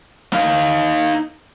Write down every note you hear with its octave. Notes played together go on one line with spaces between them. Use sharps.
D#4 F5